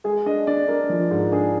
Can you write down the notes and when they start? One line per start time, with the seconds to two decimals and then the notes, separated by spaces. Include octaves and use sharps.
0.04 G#3 G#4
0.26 D4 D#5
0.47 D4 D5
0.68 D4 A#4
0.89 F3
1.11 G#2
1.32 D4 G#4